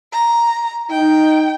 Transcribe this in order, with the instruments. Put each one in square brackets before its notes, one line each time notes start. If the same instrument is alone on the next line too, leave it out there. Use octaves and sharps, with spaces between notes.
[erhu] A#5
[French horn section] D#4 [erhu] G5